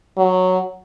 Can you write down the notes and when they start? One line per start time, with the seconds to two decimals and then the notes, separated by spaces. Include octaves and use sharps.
0.17 F#3